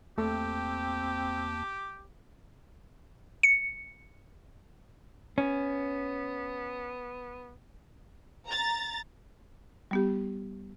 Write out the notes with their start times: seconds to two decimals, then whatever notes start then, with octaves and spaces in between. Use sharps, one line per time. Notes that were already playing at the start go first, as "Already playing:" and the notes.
0.18 E2 A3 A#3 C4 G4 A4 A5
3.43 C#7
5.38 B3 C#4
8.46 A#5 A6
9.91 G3 B3 G4